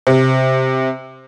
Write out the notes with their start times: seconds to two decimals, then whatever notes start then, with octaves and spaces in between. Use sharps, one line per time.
0.07 C3